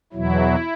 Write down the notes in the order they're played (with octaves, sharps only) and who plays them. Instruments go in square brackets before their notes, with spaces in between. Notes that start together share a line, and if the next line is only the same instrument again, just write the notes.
[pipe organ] E2 B2 F#3 E4